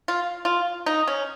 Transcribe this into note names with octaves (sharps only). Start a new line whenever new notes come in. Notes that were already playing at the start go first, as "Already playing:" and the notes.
F4
F4
D#4
C#4